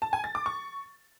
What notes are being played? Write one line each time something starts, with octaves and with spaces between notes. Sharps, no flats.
A5
G#5
A6
D6
C#6